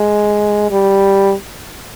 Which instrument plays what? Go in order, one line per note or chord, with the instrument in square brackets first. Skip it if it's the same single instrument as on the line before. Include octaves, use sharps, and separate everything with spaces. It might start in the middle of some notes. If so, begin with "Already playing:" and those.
Already playing: [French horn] G#3
G3